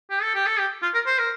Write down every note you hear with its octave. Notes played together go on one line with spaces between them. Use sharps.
G4
A4
G4
A4
G4
F4
A#4
C5
A#4